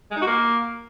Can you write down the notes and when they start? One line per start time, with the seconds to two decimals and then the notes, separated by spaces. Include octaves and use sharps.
0.11 G#3
0.16 D#4
0.22 F#4
0.27 A#3